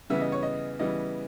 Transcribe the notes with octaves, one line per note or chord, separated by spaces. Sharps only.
C#3 E3 G3 B3 E5
D#5
C#5
D#5
C#3 E3 G3 B3 D#5